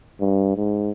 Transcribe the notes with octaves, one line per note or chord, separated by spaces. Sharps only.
G2
G#2